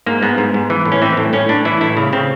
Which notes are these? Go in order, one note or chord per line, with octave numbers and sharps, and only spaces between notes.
G#2 A#3
G#2 B3
G#2
G#2
E3
A2
C#4
E3 C4
A2
A2 C#4
A2 D4
E3 E4
A2 E4
C#3
C#3 C4